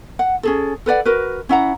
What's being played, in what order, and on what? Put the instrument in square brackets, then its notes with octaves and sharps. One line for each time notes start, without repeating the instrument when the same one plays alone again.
[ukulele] F#5
C#4 G#4 A4
A4 B4 D5 F#5
F#4 A#4 B4
C#4 E4 F#5 A#5